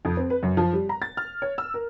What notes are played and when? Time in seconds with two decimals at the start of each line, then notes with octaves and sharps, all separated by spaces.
0.05 F2
0.17 C4
0.30 B4
0.43 F#2
0.57 F3
0.73 G3
0.89 A#5
1.02 A6
1.17 F6
1.42 C#5
1.58 E6
1.74 A#4